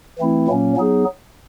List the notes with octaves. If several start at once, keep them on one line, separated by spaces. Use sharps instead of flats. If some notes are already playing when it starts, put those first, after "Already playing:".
E3 A3 C4 E4
A#2 F#3 A#3 C#4
F#3 B3 D#4 G#4